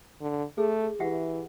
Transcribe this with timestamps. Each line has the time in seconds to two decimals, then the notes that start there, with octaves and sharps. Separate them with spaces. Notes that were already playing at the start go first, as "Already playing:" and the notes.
0.21 D3
0.58 A3 G#4
1.00 E3 G4 E5 F#5